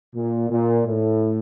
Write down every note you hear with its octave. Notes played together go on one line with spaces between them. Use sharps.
A#2
A#2
A2